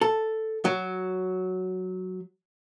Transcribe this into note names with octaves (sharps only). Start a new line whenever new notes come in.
A4
F#3